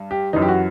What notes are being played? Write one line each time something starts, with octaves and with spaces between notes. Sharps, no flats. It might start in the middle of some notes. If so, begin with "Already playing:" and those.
Already playing: G2
G4
F#2 E3 D#4
G4
F#4